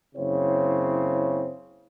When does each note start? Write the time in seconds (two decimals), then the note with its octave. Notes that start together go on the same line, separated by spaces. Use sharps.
0.15 F#1 C#3 C4 E4 C#5